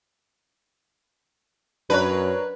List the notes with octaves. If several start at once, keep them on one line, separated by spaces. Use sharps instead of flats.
F#2 D4 A#4 B4 C#5